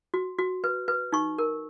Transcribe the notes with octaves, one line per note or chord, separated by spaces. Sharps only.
F#4
F#4
B4
B4
D#4 C#6
A#4